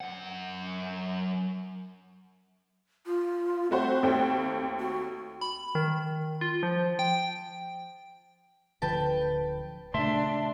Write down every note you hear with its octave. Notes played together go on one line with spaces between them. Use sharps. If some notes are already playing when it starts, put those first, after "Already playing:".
F#2 F#5
F4
A3 C4 F#4 C5
D#2 A3 G5
F#4
B5
D#3
F4
F3
G5
D1 D3 F3 B4 G5 A5
A#2 C#3 A3 D4 E5 A5 C6